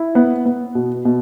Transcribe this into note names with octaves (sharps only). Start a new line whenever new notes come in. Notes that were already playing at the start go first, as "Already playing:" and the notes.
Already playing: E4
B3
B3
B2
B2